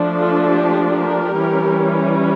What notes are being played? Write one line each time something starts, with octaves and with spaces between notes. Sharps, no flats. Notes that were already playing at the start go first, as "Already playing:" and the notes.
Already playing: F3 A3 D4
F4 A4
G4
G4 A#4
E3 G3 C#4